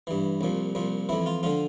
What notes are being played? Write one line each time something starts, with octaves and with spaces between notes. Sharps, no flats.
G2 E3
C2 A#2 F3
C2 A#2 F3
F2 E3 E4
F4
D3 F3 F4